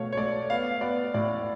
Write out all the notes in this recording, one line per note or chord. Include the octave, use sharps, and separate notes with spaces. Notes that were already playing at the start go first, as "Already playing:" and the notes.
Already playing: B2 A3 C#5 F5
C#5
A3 D5
B3 F5
B3 D5
A2 D5